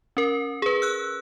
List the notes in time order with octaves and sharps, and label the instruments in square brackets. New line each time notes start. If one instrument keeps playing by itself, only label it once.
[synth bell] C#4 A#4
G#4 B4
E6 F#6